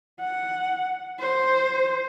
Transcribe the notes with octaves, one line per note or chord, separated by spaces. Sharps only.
F#5
C5